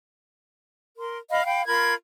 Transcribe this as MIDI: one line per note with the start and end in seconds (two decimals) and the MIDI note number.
0.98 1.18 70
0.98 1.18 84
1.30 1.44 75
1.30 1.44 77
1.30 1.44 83
1.45 1.66 77
1.45 1.66 79
1.45 1.66 83
1.66 1.94 65
1.66 1.94 70
1.66 1.94 83
1.66 1.94 92